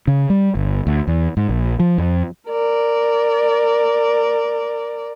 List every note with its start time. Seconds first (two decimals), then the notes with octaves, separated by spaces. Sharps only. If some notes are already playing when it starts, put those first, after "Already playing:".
0.08 C#3
0.30 G3
0.55 G1
0.87 D2
1.07 E2
1.37 G#2
1.49 A#1
1.80 F3
1.98 F2
2.50 A#4 D5